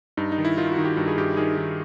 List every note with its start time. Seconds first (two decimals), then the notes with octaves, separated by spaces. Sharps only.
0.17 G2 D#4
0.32 D#4
0.38 D#3
0.45 E4
0.58 D#3 F4
0.72 F#4
0.78 D#3
0.85 G4
0.97 G2 F#4
1.08 G#4
1.17 G2 G4
1.37 D#3 G#4
1.57 D#3